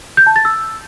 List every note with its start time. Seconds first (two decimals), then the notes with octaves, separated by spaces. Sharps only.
0.17 G6
0.27 A5
0.36 A6
0.45 E6